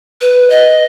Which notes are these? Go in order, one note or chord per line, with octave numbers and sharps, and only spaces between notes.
B4
D#5